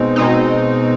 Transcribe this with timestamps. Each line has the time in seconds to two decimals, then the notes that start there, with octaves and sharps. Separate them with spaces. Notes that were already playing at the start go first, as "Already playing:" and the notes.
Already playing: B2 G#3 C4 D#4
0.16 B2 G#3 C4 D#4